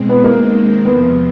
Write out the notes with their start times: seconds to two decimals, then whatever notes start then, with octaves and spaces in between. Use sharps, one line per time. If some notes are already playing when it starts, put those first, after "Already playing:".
Already playing: B2 G#3 C4
0.09 B3
0.24 D#3 G#3 A#3 C4
0.84 E2 C3 F3 B3